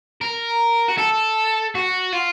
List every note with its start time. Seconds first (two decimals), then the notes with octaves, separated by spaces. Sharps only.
0.21 A#4
0.88 F#4
0.97 A4
1.75 F#4
2.13 F4